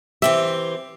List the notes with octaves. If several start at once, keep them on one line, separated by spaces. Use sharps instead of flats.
E3 C4 G4 E5